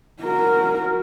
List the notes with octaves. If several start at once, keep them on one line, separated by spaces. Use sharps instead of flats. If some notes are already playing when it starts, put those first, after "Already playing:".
F#4 A#4